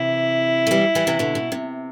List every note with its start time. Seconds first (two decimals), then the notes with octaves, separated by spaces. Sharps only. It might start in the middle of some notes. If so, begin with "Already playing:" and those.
Already playing: C3 E3 E4
0.67 A3
0.71 E3 G3
0.95 E3 G3
1.07 C3 E3
1.19 B2 D3
1.35 B2
1.52 C3